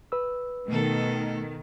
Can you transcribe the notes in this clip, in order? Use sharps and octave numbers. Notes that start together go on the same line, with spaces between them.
B4 E6
B2 D#3 A3 A4